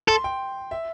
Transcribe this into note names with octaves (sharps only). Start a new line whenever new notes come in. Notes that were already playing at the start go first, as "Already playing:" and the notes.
A4 C6
G5
E5